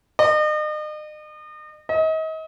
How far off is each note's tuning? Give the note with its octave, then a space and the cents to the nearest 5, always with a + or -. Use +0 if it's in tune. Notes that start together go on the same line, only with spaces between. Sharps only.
D#5 -40
D#5 +35